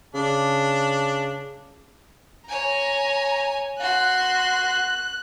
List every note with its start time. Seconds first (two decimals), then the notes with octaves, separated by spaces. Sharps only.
0.14 C#3 D4
2.49 C#5 G#5 A#5
3.80 F#4 C6 F#6